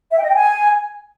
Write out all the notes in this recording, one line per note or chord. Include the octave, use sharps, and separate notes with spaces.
E5
G5
D#5
G5
G#5